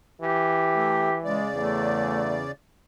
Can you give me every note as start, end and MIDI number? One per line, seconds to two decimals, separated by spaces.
0.21 1.40 52
0.21 1.15 67
0.76 1.10 57
1.25 2.51 49
1.25 1.48 56
1.25 2.51 74
1.55 2.45 40
1.55 2.38 57